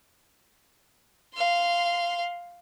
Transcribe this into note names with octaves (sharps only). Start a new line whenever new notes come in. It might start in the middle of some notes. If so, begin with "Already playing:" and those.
F5 C6